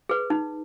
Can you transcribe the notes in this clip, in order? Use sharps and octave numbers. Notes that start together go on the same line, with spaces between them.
G#4 B4
D#4